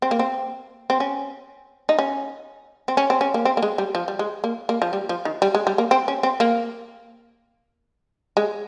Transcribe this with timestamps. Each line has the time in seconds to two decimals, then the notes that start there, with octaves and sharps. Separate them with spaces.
0.02 C4
0.11 A#3
0.19 C4
0.90 C4
1.00 C#4
1.89 D#4
1.99 C#4
2.88 C4
2.97 C#4
3.10 C4
3.21 C#4
3.34 A#3
3.45 C4
3.57 A#3
3.63 G#3
3.78 G3
3.95 F3
4.08 G3
4.19 G#3
4.44 A#3
4.69 A#3
4.82 F3
4.93 G3
5.09 F3
5.25 D#3
5.42 G3
5.55 G#3
5.67 G3
5.78 A#3
5.91 C4
6.08 C#4
6.23 C4
6.40 A#3
8.37 G#3